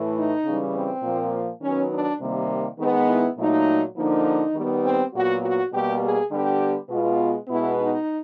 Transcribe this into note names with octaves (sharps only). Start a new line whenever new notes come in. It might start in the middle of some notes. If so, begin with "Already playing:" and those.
Already playing: A2 E3 A3
D#4
C#3 E3 G3
C4
A#2 F3 A#3
D#3 F#3 B3 C#4
D4
C3 D#3 G3 A#3
D#3 G#3 B3
E4
A#2 F#3 A3 D#4
D3 F3 A#3 D#4
D#3 G3 B3
C4
A#2 F#3 B3 F#4
F#4
B2 G3 A#3 G4
G#4
D3 G3 B3 G4
B2 G#3 B3 F4
B2 G#3 B3 E4
D#4